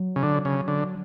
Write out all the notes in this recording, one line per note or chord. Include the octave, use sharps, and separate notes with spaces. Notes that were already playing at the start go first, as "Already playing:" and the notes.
Already playing: F#3
C#3
D3
C#3
D3